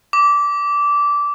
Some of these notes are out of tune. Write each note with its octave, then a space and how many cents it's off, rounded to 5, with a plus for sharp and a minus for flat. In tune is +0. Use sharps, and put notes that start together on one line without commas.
D6 -15